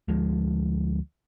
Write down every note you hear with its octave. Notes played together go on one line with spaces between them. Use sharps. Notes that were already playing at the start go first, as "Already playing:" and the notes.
D2 F3 G#3